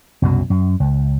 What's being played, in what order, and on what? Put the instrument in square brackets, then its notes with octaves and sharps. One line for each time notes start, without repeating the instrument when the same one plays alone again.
[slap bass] C2 F#2 B2 F#3
F#2
C#2